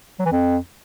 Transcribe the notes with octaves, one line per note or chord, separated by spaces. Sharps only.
F#3
E3
F2